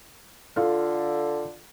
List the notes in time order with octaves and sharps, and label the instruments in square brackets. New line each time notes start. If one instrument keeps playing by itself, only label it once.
[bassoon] D3 [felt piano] F4 A4 F5